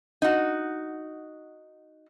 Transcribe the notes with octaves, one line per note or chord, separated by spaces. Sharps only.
D#4 F#4